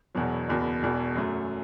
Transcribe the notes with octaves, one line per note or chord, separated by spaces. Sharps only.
E1 E2 B2 F#3
F#1 E2 B2
E1 E2 B2
F#2 F#3 A3